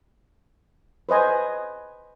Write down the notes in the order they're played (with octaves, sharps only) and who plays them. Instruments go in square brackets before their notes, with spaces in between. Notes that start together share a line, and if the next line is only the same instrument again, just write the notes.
[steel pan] B4 C5 D#5 G#5